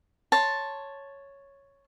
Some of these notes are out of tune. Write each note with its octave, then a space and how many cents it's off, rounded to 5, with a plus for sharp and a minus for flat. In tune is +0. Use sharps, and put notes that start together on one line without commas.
C#5 +0 A5 +0 C6 +10